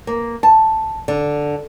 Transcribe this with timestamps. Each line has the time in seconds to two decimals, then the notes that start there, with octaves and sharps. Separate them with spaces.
0.07 A#3
0.43 A5
1.08 D3